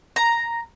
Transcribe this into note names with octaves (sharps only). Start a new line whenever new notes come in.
A#5